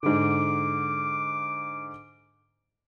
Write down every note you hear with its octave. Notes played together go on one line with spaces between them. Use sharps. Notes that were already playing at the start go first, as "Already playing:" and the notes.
G#2 D3 D6